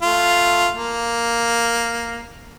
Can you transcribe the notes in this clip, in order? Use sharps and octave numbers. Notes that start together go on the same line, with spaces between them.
A3 F4
A#3